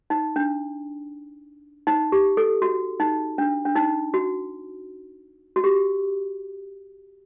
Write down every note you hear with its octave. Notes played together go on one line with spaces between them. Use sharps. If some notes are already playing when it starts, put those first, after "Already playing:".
D#4
D4
D#4
G4
A4
F#4
D#4
D4
D4
D#4
F#4
F#4
G4